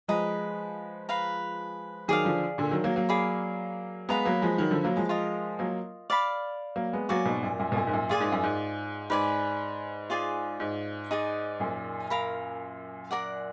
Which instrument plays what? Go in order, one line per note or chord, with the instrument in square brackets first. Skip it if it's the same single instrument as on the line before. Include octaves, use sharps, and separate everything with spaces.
[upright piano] F3 G#3 [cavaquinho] B4 D#5 A#5
[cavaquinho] B4 F5 A#5
[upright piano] D#3 F#3 [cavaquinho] G#4 D5 F5
[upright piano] D3 F3
A#2 D3
D#3 F#3
F#3 A#3
F#3 A#3
[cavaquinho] G#4 D5 F5 B5
[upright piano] G#3 B3 [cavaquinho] B4 F5 A#5 D#6
[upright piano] F#3 A#3
F3 G#3
D#3 F#3
D3 F3
F#3 A#3
F3 G#3
[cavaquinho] F4 A#4 D#5
[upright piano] F#3 A#3
[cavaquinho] D5 F5 B5
[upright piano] F#3 A#3
G#3 B3
[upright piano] F#3 A#3 [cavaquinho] F#4 D5 G#5
[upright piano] G#2 B2
F#2 A#2
F#2 A#2
B2
F#2 A#2
G#2
F#2 A#2
[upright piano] A#2 [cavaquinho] F4 G#4 D5 G#5
[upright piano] G#2
F#2
G#2
[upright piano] G#2 [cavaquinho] B4 D5 G#5
[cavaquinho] F4 G#4 D5 G#5
[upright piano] G#2
[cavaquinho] D#4 G#4 D5
[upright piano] F#2 A#2
[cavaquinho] A#4 F5 B5
A#4 D5 F#5